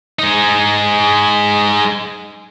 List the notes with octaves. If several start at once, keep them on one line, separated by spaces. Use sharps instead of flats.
G#3 D#4